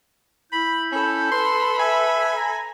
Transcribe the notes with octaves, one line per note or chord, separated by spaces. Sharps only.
E4 B5 G6
C#4 A4 B5
B4 C6
E5 G#5
A#5